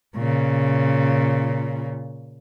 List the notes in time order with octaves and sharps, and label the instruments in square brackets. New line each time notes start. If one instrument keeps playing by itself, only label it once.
[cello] A#2 C#3